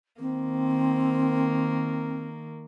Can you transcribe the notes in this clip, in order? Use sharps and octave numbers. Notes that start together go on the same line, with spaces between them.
D#3 A#3 C4